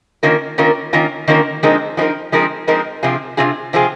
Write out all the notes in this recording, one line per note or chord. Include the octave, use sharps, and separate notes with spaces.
D#3 A#3 C#4 F4 A#4
D#3 A#3 C#4 F4 A#4
D#3 A#3 C#4 F4 A#4
D#3 A#3 C#4 F4 A#4
F3 G#3 C4 D#4 A#4
F3 G#3 C4 D#4 A#4
F3 G#3 C4 D#4 A#4
F3 G#3 C4 D#4 A#4
C3 F3 C4 F4 G#4
C3 F3 C4 F4 G#4
C3 F3 C4 F4 G#4